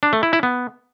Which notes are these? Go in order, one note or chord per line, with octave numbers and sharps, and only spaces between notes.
D4
A3
E4
E4
B3